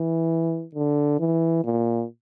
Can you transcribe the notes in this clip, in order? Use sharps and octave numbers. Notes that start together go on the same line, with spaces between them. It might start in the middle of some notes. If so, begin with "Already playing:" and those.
Already playing: E3
D3
E3
A#2